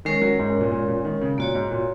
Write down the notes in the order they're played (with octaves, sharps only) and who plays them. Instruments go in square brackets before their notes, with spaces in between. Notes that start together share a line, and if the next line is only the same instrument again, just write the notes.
[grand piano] D#3 [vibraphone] G#3 C#4 A#4 C#5
[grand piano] F#3
G#2
G#2
A#2
A#2
A#2
D#3
C#3
[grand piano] A#2 [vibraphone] A#3 F#4 C#5
[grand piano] G#2
A#2